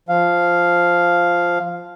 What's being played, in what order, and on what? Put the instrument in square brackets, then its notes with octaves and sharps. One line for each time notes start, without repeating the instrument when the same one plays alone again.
[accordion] F3 F5